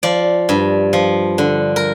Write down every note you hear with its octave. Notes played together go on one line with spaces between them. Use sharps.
F3 D5
G2
F3
D3
A#4